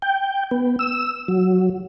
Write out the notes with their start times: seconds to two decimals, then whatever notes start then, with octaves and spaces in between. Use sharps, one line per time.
0.02 G5
0.51 B3
0.79 E6
1.28 F#3